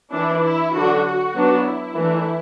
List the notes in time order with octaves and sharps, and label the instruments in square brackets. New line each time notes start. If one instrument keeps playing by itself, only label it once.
[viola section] E3 D4 E4
E4
D3 F#3 D4 F#4
F#4
F#3 B3 D4
E4
E3 A3 D4